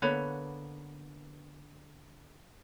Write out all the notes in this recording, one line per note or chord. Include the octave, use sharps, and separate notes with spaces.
D3 A#3 B3 B4 C#5 B5